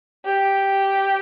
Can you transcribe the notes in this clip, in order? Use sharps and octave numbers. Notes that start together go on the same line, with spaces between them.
G4